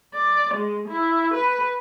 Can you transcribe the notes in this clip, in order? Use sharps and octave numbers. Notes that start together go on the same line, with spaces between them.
D5
G#3
E4
B4